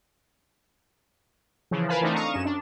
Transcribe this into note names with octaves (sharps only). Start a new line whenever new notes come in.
C#3 E3 F3
A#4 B4 F5 G#5 A5 B5
E3 A3 C4 D4 D#4
F5 A#5 C#6 D#6
F#2 C#4 E7
D4